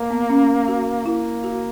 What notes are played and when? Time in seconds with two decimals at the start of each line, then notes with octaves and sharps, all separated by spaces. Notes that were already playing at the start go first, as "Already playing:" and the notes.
Already playing: A#3
0.10 B3
0.30 C#4
0.68 F#4
1.06 A#3 E4
1.44 F#4